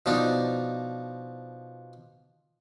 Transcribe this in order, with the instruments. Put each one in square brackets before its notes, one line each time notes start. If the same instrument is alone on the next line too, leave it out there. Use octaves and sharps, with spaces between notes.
[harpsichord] B2 F3 D4 D#4